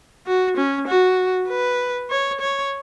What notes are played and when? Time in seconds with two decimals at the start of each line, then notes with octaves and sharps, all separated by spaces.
0.27 F#4
0.57 C#4
0.88 F#4
1.49 B4
2.10 C#5
2.41 C#5